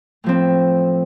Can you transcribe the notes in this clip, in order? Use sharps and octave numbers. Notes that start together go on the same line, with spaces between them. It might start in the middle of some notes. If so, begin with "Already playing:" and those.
A2 F3 C4